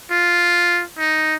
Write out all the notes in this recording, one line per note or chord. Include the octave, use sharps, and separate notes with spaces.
F4
D#4